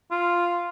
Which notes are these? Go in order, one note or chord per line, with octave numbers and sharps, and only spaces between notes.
F4